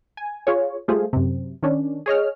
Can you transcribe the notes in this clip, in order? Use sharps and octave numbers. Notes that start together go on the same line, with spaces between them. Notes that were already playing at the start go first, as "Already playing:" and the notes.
G#5
F4 G#4 C#5
G3 A3 F4 G#4 C5
F#2 C3
D#3 C#4 D4
G#4 C#5 D#5 F6